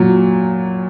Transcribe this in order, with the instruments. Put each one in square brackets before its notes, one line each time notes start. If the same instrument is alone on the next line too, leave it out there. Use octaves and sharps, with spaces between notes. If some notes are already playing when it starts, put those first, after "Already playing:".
Already playing: [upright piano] A#2 F#3